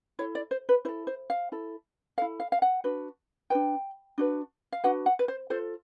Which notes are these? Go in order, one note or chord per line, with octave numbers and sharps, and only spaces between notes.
E4 A4 C#5
D5
C5
B4
E4 A4 C5
C5
F5
E4 A4
E4 A4 F5
F5
F5
F#5
D4 F#4 B4
D4 F#4 B4 G5
D4 F#4 B4
F5
D4 F#4 B4 F#5
F#5
B4
C5
F4 A4 C5